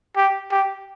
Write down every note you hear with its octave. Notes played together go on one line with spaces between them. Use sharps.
G4
G4